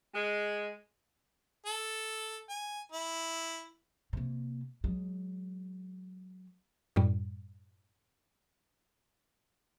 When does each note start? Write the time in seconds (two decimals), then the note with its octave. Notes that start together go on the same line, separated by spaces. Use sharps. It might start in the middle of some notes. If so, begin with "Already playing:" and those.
0.15 G#3
1.66 A4
2.49 G#5
2.92 E4
4.13 C3 A#3
4.84 F#3 G#3
6.96 F#2 A2 G3